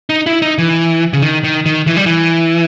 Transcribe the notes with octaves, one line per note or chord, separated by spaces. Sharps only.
D#4
E4
D#4
E3
C#3
D#3
D#3
D#3
E3
G3
E3